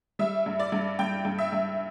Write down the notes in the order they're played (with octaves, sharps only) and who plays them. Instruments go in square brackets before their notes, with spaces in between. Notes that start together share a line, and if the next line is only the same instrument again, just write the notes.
[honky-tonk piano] G3 E5
G2
D5
G2
G2 G5
G2
E5
G2